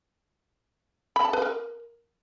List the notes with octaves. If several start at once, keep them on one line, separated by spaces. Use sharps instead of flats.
B5
A5
B4
A#4